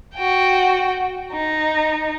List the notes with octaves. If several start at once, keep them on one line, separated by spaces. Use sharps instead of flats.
F#4 G5
D#4